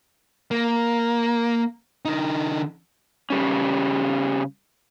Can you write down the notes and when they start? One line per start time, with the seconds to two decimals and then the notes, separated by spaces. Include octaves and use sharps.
0.51 A#3
2.05 D3 D#4
3.30 C#3 G3 C#4